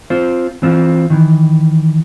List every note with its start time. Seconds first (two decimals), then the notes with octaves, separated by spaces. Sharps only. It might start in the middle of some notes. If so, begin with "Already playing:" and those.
0.10 C4 F4 C5
0.62 E3 C4 F4
1.10 D#3 E3